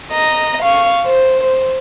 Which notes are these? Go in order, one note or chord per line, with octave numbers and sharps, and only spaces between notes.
D#5 A#5
F5 C#6
C5
C5